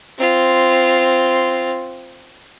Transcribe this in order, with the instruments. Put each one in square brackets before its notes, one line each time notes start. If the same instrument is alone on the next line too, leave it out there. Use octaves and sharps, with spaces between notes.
[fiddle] C4 F4